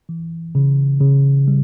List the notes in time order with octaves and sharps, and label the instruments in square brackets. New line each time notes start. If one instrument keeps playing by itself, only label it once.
[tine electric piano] E3
C#3
C#3
G3